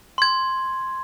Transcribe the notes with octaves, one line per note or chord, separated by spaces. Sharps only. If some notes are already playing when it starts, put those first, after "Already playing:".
C6 G#6